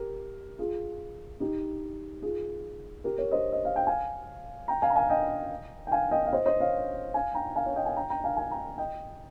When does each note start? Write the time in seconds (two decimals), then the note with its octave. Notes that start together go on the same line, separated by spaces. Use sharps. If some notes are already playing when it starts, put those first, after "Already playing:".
Already playing: G4 A#4
0.59 F4 G#4
1.40 D#4 G4
2.22 F4 G#4
3.04 G4 A#4
3.18 A#4 C#5
3.31 C5 D#5
3.52 D#5
3.65 F5
3.76 G5
3.87 F5 G#5
4.68 G5 A#5
4.82 F5 G#5
4.90 A#5
4.96 F5 G#5
5.10 D#5 G5
5.87 G5
5.91 F5 G#5
6.11 D#5 G5
6.26 F5
6.33 C5 D#5
6.46 C5 D#5
6.60 C#5 F5
7.14 F5 G#5
7.34 G5 A#5
7.56 F5 G#5
7.66 C#5 F5
7.76 D#5 G5
7.86 F5 G#5
7.96 G5 A#5
8.10 G5 A#5
8.24 F5 G#5
8.37 F5 G#5
8.50 G5 A#5
8.78 D#5 G5